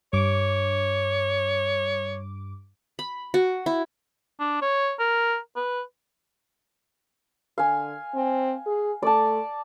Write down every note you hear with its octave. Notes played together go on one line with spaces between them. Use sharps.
G2 C#5 D6
B5
F#4
E4
D4
C#5
A#4
B4
D3 F5 G#5
C4
G#4
A3 D5 A5